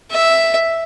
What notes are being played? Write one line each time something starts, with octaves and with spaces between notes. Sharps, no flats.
E5